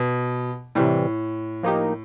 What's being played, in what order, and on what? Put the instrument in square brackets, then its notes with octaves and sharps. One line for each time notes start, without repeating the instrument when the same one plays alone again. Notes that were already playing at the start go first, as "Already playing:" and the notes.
Already playing: [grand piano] B2
[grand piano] A2 [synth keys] C3 E3 G3
[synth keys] F3 A#3 D#4 G4